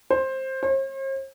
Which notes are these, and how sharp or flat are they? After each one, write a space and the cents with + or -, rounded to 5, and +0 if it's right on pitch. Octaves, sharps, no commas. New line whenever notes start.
C5 +15
C5 +45